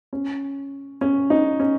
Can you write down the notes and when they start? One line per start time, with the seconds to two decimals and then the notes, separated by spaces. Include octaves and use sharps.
0.13 C#4
1.01 C#4
1.30 D#4
1.60 C#4